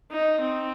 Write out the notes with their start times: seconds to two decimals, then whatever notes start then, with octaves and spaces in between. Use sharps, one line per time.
0.11 D#4
0.41 C4